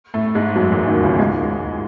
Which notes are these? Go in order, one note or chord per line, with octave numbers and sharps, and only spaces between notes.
A2 A3
G#2 G#3
F#2 F#3
E2 E3
D#2 D#3
C#2 C#3
G#2 G#3